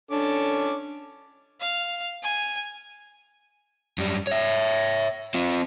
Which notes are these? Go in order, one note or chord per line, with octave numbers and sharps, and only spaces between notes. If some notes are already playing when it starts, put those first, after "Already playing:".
C#4 D4 A4 D6
F5
G#5
F#2 G3
C#5 E5
C4 F4